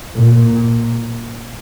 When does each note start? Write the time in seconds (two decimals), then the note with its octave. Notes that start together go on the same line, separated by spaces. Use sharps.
0.16 A#2